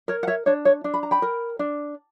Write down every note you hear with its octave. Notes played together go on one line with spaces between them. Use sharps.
A#4 C#5
F#5
C#5 E5
D4 C#5
C#5
D4
B5
A#5
G5 B5
A#4
D4